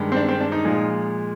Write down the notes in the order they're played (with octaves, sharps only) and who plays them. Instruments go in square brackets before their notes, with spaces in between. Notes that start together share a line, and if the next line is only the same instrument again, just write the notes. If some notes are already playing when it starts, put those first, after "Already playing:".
Already playing: [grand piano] G2 D#3 G#3
C4
D4
C4
D4
D#4
A#2 F3 G#3